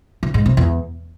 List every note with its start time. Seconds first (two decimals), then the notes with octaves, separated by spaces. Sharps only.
0.23 C#3
0.34 G#2
0.46 C3
0.57 E2